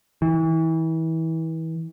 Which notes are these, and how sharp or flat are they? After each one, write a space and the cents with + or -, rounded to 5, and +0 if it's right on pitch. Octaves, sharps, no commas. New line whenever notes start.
E3 -30